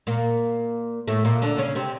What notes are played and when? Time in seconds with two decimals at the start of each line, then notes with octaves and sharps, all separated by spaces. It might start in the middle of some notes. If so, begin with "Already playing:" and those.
0.07 A#2 A#3
1.08 A2 A3
1.25 A#2 A#3
1.42 D3 D4
1.58 C#3 C#4
1.75 C3 C4